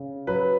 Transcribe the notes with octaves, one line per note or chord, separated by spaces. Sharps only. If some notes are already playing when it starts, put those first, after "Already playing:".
Already playing: C#3
F#3 B4